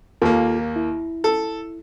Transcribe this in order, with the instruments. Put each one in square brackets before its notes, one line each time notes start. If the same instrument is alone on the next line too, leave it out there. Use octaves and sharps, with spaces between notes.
[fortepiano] D#2 A#3 [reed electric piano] F4 A4 A#4
[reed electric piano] E4
[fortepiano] A4